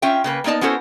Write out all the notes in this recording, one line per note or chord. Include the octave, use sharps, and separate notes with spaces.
C#4 F4 E5 G5
C#3 A#3 B4
A#3 B3 D#4 D5 A5
B3 C#4 E4 F#4 A4 C5